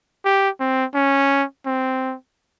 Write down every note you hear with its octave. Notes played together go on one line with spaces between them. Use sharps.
G4
C4
C#4
C4